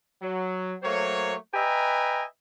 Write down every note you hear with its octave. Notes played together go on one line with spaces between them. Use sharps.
F#3
F#3 A3 A#3 C5 C#5
B4 D#5 E5 G5 G#5 A#5